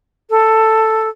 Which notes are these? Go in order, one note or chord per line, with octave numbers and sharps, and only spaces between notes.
A4